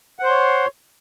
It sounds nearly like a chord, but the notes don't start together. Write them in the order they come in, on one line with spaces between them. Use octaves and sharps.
F#5 C5 C6 C#5